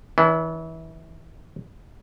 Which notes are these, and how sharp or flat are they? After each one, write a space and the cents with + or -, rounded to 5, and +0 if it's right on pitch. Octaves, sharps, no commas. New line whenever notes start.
E3 -25 C#4 +45